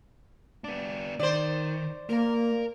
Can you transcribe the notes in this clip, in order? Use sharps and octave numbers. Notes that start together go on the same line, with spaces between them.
B3 D4
D#3 C5 D5
A#3 A#4 A#5